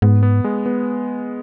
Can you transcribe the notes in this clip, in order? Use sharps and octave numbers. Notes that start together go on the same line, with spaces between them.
G#2 B3
B3
G#3
B3